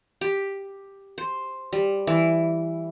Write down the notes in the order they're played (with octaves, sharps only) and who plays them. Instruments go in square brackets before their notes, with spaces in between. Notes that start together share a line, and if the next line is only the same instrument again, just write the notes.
[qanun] G4
C5
G3
E3